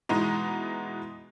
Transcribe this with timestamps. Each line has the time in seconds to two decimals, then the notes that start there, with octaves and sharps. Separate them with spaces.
0.09 B2 E3 G#3 B3 D#4